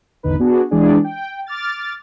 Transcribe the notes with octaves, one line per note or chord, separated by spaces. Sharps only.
G#1 E2 D3 D#4 B4
B3 D4 F#4 G#4
E3 G#3 D4 G#4 D5
G5
D6 F6 A6